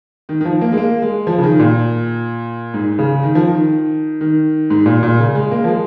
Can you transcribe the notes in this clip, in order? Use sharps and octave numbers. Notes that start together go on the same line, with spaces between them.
D#3
D#3
F3
A#3
G#3
A#3
G#3
F3
C#3
D#3
A#2
G#2
C#3
D#3
F3
D#3
D#3
G#2
A#2
A#2
C#3
G#3
A#3
F3
G#3